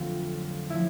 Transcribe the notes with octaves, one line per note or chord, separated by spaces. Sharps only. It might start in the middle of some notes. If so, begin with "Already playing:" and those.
Already playing: F2 D3 F#3 A3 C4 F4
F3 A3 C#4 E4